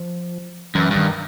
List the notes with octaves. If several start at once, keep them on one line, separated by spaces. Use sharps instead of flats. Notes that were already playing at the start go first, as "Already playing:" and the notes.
Already playing: F3
F#2 E3
G2
D#3